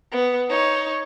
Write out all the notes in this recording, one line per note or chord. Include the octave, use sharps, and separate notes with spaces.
B3
D#4 C#5